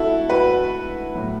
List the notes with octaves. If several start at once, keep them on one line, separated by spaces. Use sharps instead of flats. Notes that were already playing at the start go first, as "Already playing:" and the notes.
Already playing: E4 F#4 A4
F#4 B4
A2 F#3